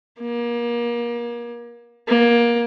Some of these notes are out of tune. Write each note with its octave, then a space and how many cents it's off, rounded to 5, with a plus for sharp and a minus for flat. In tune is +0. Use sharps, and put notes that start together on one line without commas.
A#3 +30
A#3 +20